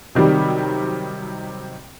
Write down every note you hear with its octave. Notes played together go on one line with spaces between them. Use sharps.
C3 D#3 F#3 G3